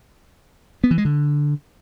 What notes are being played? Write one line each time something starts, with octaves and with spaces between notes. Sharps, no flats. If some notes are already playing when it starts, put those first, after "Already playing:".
B3
E3
G#3
D3